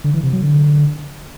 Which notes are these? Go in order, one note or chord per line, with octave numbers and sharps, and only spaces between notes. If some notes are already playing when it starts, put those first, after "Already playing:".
D3
E3
C3
F#3
D3